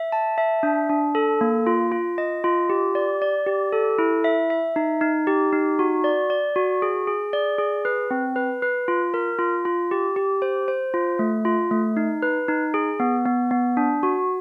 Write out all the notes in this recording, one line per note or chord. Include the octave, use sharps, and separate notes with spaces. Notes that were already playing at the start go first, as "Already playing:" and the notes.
Already playing: E5
A5
E5
D4
D4
A4
A#3
F4
F4
D#5
F4
G4
D5
D5
G4
A4
E4
E5
E5
D#4
D#4
G4
D#4
F#4
D5
D5
F#4
G#4
G#4
D5
G#4
B4
C4
B4
B4
F4
A#4
F4
F4
G4
G4
C5
C5
F4
A3
F4
A3
D#4
B4
D#4
G#4
B3
B3
B3
D4
F#4